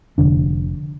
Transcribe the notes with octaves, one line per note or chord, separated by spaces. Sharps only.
F1 C#2 D3 D4